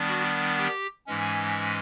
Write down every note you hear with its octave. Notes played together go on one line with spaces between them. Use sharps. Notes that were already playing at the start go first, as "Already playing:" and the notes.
Already playing: D#3 G3 B3 D4
F#4
G4
G#2 E3 G#3 C#4